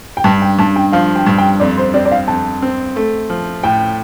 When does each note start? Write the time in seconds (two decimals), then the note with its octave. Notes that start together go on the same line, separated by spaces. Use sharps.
0.17 G5
0.24 G2 A5
0.42 G5
0.59 G2 A5
0.76 G5
0.92 F3 F5
1.16 G5
1.27 G2
1.38 G5
1.60 F2 D5
1.77 C5
1.94 C4 D5
2.05 D5
2.12 F5
2.28 F2 A5
2.62 C4
2.96 A3
3.30 F3
3.63 A2 G5